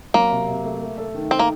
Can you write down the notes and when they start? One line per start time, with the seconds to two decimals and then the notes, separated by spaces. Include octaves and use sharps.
0.14 F#3 A#3
0.31 C3
0.48 C3
0.64 A3
0.81 A3
0.98 A4
1.15 D#3
1.31 C4 D#4
1.39 A#3